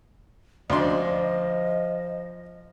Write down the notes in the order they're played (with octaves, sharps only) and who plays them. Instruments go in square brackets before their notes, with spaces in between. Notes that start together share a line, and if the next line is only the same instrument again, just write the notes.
[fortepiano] D2 D4 C6 [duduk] F3 [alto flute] D#5